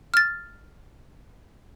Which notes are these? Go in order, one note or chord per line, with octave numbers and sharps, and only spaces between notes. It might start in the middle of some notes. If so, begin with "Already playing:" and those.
F6 A6